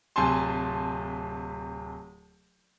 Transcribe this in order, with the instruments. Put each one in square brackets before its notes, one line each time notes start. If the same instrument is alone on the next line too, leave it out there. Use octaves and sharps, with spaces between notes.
[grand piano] D1 C3 G#5 A5 C6